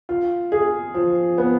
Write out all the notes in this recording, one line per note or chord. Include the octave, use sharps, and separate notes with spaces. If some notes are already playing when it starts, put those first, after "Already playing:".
F4
G#4
F3
B3